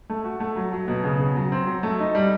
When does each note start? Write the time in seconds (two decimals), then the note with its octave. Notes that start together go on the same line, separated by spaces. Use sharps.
0.09 A3
0.24 F#4
0.40 A3
0.56 F#3
0.73 F#3
0.88 B2
1.04 C#3
1.19 C#3
1.36 F#3
1.52 C4
1.67 F#3
1.83 A3
1.99 D#4
2.15 G3